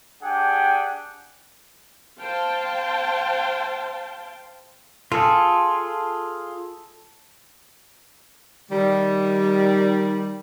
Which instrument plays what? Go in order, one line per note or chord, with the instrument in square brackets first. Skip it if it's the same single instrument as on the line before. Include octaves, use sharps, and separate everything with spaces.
[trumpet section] D4 G4 G#4 F#5 G5
[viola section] C5 F5 G5 A5
[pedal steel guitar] F4 G#4 [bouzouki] A4
[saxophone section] D#3 G3